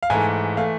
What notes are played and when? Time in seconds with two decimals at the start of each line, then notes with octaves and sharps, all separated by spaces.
0.03 F5
0.10 G#2 E3 A3 G#5
0.57 E3 A3 F5